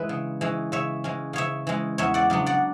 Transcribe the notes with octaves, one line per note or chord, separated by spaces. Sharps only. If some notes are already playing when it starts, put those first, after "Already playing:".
Already playing: E3 G#3 B4 E5
C#3
E3 G#3 C#4
C#3 C#5 E5
E3 G#3 C#4
C#3 C#5 E5
E3 G#3 C#4
E2 C#5 E5
D5 F#5
C#3 F#3 B3 D4
D5 F#5